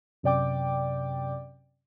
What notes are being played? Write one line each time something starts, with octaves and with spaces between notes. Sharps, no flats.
F#2 C3 D5 G5 D6